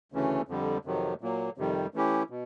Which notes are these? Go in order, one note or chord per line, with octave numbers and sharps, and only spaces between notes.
D2 C#3 E3 A3 C#4
F2 D3 G3
F2 C3 D#3 F#3
A#2 F#3 A#3
F2 C3 D#3 G3
E3 A3 C#4 E4 G4
B2